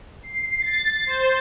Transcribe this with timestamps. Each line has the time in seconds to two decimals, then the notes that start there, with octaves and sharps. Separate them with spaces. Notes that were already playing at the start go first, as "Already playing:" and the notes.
0.22 C7
0.61 A6
1.06 C5